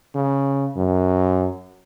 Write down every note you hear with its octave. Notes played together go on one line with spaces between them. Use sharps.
C#3
F#2